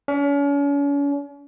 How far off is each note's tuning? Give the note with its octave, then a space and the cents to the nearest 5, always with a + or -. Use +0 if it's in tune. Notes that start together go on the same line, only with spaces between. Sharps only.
C#4 +40